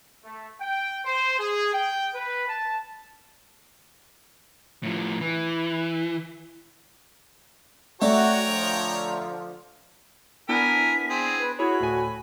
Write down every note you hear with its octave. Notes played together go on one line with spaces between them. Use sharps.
A3
G5
C5
G#4
G5
B4
A5
A2 F3
E3
A3 F#4 C#5 D5 E5 G5 A#5
D3 F3
B3 D4 E4 A#4 G#5 B6
C4 G#4
B4
E4 F#4 G#4 C#5 B5
D2 A2 G#5